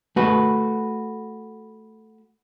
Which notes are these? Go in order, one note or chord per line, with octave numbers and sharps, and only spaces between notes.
A3 F#4 B4